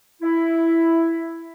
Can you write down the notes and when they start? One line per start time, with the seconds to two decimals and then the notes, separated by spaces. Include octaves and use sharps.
0.22 E4